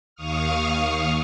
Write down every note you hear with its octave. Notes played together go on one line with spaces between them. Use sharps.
D#2 F5 C#6 D#6 F6